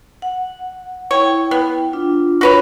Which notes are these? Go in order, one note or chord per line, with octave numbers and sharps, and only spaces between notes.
F#5
E4 C#5 G5
B3
D4 F4
F#4 B4 C#5